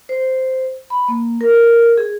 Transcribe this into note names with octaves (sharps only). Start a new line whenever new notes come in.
C5
B5
A#3
A#4
G#4